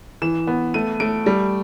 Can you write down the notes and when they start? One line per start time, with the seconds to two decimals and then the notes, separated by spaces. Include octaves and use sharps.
0.22 E3 E7
0.47 B3
0.74 A3 D#7
1.00 A3 D7
1.26 G3